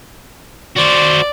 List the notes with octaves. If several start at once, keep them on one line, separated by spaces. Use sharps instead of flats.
F#4 C5 D5